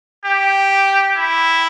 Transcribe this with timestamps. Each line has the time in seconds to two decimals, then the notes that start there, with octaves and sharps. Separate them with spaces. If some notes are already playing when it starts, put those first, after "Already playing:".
0.25 G4
1.17 E4